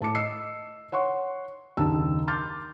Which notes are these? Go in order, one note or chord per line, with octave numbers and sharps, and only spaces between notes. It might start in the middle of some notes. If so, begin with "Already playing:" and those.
A2 A5 D6 C#7
D#5 E6 C7 C#7
C#5 F#5 C6 C#6
F#1 D#2 D4 D#4 A5 E6
C6 D6 F6 G6 A6